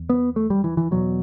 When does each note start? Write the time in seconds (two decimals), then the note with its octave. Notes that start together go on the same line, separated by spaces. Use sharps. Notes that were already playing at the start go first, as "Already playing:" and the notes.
Already playing: E2
0.10 B3
0.36 A3
0.50 G3
0.64 E3
0.77 E3
0.91 E2 B2 F#3